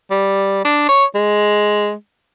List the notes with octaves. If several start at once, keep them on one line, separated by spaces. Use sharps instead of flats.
G3
D4
C#5
G#3